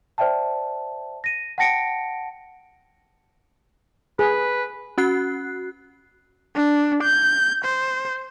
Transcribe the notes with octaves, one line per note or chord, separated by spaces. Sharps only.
C5 D5 E5 G5 A5
A#6 D#7
F#5 G5 A5 A#6 C#7 D7
G#4 B4
C#4 F#4 F#6 C7
D4
G6
C5